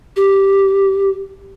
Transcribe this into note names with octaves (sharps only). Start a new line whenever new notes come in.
G4